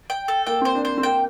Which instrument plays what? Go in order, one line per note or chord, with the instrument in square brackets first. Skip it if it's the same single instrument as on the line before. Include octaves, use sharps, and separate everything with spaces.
[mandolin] G5
A4
[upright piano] A#3 [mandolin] G5
[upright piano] C4
[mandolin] C5
[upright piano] D4
[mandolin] C5
[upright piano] C4
[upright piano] A#3 [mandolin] G5